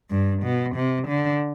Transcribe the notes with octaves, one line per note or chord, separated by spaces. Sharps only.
G2
B2
C3
D3